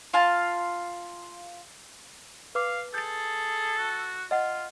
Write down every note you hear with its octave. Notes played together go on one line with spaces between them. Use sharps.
F4 F5 A5
B4 F5 D6
G#4 A4 G6 A6
F#4
F4 D#5 F#5